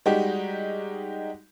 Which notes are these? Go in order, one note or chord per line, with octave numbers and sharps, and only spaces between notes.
G3 G#3 D#4 F#4 G4